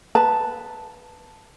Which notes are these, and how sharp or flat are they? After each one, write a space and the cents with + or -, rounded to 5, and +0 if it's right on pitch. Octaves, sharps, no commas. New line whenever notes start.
B4 +0 A5 +0